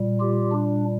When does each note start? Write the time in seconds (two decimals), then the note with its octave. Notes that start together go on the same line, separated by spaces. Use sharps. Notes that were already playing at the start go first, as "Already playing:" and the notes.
Already playing: A#2 G3
0.20 F4 G4
0.52 D4